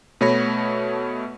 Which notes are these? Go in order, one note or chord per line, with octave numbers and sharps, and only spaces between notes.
B2 A3 C#5 B5 A#6